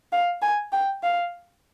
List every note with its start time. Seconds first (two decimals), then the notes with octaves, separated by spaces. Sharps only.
0.12 F5
0.42 G#5
0.72 G5
1.03 F5